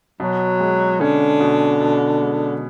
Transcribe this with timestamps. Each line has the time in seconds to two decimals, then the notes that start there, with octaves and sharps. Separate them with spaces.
0.20 B2 F#3
0.60 G#3
1.01 D3 C#4
1.40 B2
1.81 B2
2.21 G#3